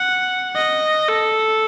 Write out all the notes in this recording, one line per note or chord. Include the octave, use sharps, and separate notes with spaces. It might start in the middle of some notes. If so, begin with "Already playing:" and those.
Already playing: F#5
D#5
A4